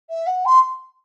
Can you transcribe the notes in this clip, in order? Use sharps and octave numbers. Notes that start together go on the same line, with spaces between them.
E5
F#5
C6